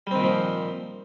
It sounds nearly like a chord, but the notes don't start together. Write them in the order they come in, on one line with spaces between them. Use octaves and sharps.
G3 C4 D#3 A#2 F3